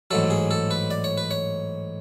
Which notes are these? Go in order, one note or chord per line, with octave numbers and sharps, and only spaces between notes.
A1 G#2 F#3 A4
G#4
A4
B4
D5
C#5
B4
C#5